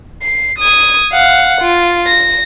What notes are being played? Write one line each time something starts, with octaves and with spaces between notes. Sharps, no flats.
C7
D#6 G#6
F5 F#5
F4
A#6